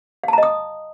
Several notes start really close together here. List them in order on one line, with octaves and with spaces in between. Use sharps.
F5 A5 A#5 D#5 D#6